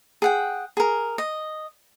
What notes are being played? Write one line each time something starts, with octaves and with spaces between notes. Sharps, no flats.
G#4 F#5 G5
G#4 A#4
D#5